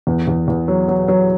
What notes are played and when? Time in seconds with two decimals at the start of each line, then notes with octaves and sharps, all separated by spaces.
0.07 E2
0.27 E2
0.48 E2
0.68 F#3
0.88 F#3
1.08 F#3